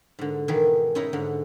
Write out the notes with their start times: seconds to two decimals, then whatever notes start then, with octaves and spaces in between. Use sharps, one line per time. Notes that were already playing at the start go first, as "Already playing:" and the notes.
0.19 G#2 D3
0.48 B2 D#3 E3 E4 G#4 B5
0.95 C#4 D#4 E4 C#5 A#5 B5
1.13 G#2 D3